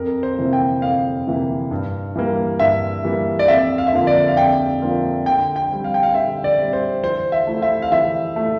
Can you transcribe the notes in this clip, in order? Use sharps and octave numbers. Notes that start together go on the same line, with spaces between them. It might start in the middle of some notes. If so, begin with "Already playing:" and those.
Already playing: F2 A#4
C5
C3 E3 A#3 E4
G5
F2 F5
C3 E3 A#3 E4
G2
E3 G3 A#3
G2 E5
E3 G3 A#3
D5
F2 E5
F5
E5
D3 F3 A#3 F4 F5
D5
F5
F2 G5
D3 F3 A#3 F4
D3 G5
G5
G3 C4
F5
G5
F5
D3 E5
D5
G3 C4
C5
E3 C5
E5
A3 E4
E5
F5
E3 E5
A3 E4